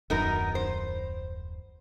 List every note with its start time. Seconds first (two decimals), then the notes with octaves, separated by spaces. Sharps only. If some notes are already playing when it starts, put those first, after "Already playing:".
0.10 D#1 F#2 B3 D#4 A#4
0.55 C5